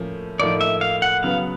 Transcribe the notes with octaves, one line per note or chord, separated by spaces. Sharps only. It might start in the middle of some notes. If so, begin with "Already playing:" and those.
Already playing: A2 F3 A#3 C#4
A2 F3 A#3 D#4 D5
E5
F5
F#5
C#3 F#3 B3 F5